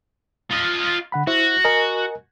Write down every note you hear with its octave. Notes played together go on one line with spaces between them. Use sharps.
F4 D#5
D3 F#5 B5
E4 F#4 C5 E5
A#4 D#5 G#5